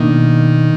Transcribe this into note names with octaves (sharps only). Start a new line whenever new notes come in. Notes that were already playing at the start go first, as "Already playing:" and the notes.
Already playing: B2 D#3 A#3 D4